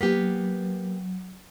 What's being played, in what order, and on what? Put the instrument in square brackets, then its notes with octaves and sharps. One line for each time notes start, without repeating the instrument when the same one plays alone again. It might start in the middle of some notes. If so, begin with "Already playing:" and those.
[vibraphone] F#3 [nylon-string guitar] A#3 B3 G4